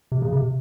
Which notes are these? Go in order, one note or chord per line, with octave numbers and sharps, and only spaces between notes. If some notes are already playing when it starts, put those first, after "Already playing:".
C3
C#3
C3